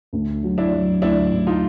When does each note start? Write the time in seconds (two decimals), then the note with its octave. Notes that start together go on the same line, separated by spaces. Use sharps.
0.13 D2
0.43 F#3
0.58 D4 E4
0.73 F#3
1.02 D2 D4 E4
1.33 D2
1.47 D#4 F4